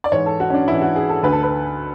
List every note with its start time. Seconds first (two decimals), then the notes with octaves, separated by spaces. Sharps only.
0.04 D5
0.11 G#2 E3 C#5
0.26 A4
0.40 F#4
0.50 C#4
0.54 D4
0.67 G#2 E3 E4
0.82 F#4
0.96 G#4
1.09 A4
1.23 D2 D3 B4
1.32 A4
1.43 B4